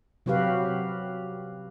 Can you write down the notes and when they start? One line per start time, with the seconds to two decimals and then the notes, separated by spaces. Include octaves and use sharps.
0.26 C3 F#3 F#4 G4 B4 F5